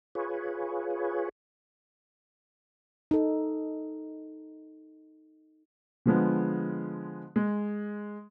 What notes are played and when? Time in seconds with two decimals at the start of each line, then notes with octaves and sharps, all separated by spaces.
0.15 F4 G#4 B4 C#5
3.11 D#4 A4
6.06 D3 F3 G#3 B3
7.36 G#3